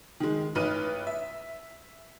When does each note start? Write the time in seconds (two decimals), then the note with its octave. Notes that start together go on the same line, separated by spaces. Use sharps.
0.20 D#3 G#3
0.55 A1 D#4 B4 F6 D#7
1.07 E5